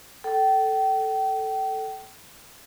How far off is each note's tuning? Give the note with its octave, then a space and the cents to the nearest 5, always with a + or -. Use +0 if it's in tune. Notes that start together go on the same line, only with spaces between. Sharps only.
A4 +0 G5 -35